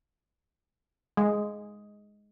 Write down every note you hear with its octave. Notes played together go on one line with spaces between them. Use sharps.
G#3